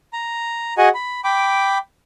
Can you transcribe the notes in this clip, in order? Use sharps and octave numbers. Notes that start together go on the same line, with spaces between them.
A#5
F#4 G#4 D#5 F#5 G#5
B5
G5 B5 D6